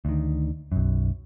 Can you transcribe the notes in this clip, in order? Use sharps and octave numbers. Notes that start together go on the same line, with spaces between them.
D2 D#3
B1 F#2